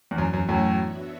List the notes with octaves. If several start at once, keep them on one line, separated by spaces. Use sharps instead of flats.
E2
F#2 E3 B3 F#4
F#2
F#2 A2
B3 D4 F#4 C#5 E5